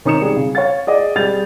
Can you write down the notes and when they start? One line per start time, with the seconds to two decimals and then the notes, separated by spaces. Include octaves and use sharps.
0.05 D#3 C#4 D#4 D#6 C#7 E7
0.21 G3 G#4
0.37 C#3
0.55 C#5 F5 A6
0.87 G#4 D5 D#5
1.16 G3 G#4 G6 A6 F7